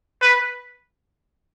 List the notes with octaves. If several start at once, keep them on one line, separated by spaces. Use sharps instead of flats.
B4